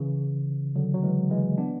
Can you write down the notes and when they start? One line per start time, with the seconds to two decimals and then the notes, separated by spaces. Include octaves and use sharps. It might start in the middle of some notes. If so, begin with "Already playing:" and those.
Already playing: C#3 E3
0.76 D3 F#3
0.94 F#3
1.03 E3 G#3
1.31 E3 G#3
1.58 B3 D4